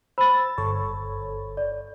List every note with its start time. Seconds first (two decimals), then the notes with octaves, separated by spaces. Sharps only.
0.18 C5 B5 E6 A6
0.58 G1 A4 C#5
1.57 D5